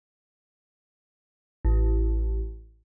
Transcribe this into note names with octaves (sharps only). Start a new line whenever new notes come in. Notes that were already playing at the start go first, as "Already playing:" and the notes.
A1